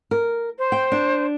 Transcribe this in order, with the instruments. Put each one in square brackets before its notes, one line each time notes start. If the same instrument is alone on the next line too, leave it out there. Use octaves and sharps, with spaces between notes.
[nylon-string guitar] A#4
[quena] C5
[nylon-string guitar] G5
D4